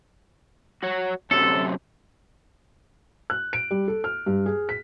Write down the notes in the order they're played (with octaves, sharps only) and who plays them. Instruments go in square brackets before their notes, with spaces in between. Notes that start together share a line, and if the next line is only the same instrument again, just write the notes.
[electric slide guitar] F#4 C#5
[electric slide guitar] F#2 C3 F#3 [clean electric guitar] A4
[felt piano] F#6
D7
G3
A4
F6
G2
G#4
B6